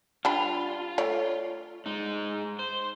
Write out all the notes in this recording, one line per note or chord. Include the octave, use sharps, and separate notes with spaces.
G3 D4 F4 B5
A3 C#5 D5
G#3 D#4
C5